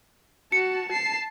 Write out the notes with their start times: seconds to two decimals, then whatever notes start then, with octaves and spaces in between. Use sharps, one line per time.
0.52 F#4 A5 C#7
0.89 A5 C7